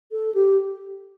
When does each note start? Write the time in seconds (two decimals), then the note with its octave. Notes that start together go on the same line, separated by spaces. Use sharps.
0.12 A4
0.35 G4